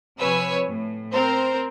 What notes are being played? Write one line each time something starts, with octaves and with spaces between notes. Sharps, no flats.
C3 F3 B4 C#5 G#5 E6
A2
C4 A#4 C5